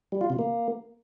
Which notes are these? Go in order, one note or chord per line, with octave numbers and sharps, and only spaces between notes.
G3
F4
C3
A#3